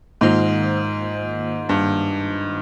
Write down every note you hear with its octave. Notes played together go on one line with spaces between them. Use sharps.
G#2 D#3 A#3 F4 C5
G2